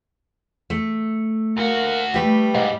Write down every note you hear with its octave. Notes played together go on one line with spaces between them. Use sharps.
A3
D2 A#3 F#4
G3 A3 G4 B4
G#2 D5 D#5 F5